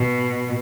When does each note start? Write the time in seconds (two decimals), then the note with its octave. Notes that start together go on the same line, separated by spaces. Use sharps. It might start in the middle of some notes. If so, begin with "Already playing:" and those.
Already playing: B2